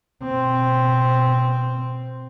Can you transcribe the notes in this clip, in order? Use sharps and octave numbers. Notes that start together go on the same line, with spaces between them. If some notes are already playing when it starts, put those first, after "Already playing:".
B2 C4